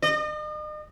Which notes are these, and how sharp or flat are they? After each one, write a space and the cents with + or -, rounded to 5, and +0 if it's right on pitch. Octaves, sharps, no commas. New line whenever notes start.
D#5 -40